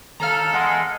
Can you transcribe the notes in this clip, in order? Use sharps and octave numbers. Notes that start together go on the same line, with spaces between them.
D#3 A4 C#5 F5 A#5 F6
E2 G#3 F#5